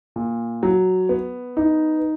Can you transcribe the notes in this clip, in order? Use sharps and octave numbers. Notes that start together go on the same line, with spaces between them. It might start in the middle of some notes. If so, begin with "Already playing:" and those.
A#2
F#3
B3
D#4